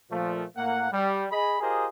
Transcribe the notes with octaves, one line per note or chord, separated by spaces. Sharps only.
A#2 F3 A3
A2 A#3 F#5
G3
G#4 D#5 B5
F4 G4 G#4 A#4 C5 D#5